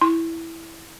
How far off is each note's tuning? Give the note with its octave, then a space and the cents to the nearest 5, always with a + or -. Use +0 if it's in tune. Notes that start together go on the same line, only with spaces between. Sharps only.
E4 +0 C6 +5